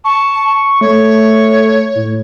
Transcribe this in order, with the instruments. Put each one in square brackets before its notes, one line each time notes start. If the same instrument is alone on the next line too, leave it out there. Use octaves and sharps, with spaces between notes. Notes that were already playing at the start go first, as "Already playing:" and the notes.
[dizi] A5 [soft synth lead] C#6
[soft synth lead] A3 [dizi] C#5
[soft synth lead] A2